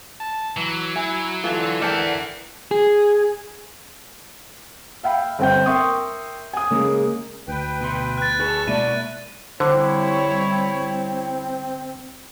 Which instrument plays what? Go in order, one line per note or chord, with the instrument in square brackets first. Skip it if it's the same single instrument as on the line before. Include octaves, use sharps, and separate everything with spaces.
[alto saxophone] A5
[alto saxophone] E3 [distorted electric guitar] F#3
[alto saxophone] E4 [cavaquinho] G#5
[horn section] D3 E3 [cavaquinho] F4 [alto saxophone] A4
[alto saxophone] A#4 [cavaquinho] D5 G5 A5 [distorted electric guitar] E5 F#5
[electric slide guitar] G#4
[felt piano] E5 F5 G5 B5
G1 C4 G5 G6
A#4 E5 G5 C6 C#6 D#6
G#5 D#6
C#3 G#3 A#3
[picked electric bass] D2 [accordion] B4 G5
[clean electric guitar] B2 C6
[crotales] F#6 A6
[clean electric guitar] G#4 B4 [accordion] A5 C#6
[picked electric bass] B2 G#3 A#3 [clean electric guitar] E4 D5 [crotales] D#7
[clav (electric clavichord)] D3 [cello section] G3 E4 C#5 [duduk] C4 [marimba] C5 D6